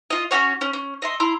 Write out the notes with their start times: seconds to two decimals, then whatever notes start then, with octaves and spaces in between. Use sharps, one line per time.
0.10 F4 D#5
0.31 C#4 D4 F#4 C#5
0.61 C#4
0.73 C#4
1.02 D#5 E5 C6
1.20 E4 A#5 C6